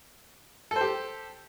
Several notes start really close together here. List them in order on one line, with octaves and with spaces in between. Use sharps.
A4 C5 G4